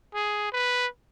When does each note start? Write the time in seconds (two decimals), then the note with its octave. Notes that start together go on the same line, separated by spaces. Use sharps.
0.14 G#4
0.52 B4